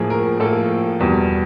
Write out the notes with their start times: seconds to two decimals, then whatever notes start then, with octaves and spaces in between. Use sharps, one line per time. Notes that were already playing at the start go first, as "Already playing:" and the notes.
Already playing: A2 F3 A#3 G#4
0.10 A#4
0.40 A2 F3 A#3 A4
1.00 E2 B2 G3